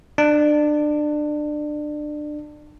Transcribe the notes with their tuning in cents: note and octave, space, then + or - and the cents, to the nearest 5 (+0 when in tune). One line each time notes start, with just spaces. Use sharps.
D4 +25